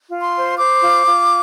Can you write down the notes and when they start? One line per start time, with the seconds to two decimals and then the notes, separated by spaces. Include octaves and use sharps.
0.09 F4
0.21 C6
0.34 C5
0.58 C5 D6
0.82 F4
1.07 F4